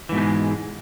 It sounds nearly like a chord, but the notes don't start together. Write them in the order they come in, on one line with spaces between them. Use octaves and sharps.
E3 G#2 B2 A3 G#3